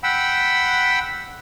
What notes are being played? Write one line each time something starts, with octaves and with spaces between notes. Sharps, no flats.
F#5 G5 B5 E6